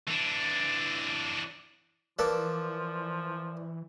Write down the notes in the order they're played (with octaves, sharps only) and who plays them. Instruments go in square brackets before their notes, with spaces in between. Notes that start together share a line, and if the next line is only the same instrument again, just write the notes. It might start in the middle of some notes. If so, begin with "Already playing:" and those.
[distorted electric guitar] E3 D4
[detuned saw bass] E3 [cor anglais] F3 [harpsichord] A#3 A4 B4 [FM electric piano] D5 D6